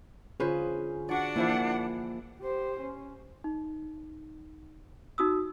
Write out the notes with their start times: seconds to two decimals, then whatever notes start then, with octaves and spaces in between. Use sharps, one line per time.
0.40 D3 C#4 F4 G#4 B4 C5
1.09 D4 F#4 D5 F#5
1.36 E3 F3 A#3 E4
2.39 G4 C5
2.80 C#4
3.44 D#4
5.18 D#4 F#4 D#6 E6